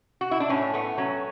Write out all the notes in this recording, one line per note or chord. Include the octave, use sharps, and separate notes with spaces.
F#4
E4
D4
A2 C#4
A3 B3
F#3 C#4